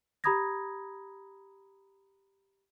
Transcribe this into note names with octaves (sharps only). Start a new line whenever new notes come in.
G4 A#5 B5 D#6 G#6 A#6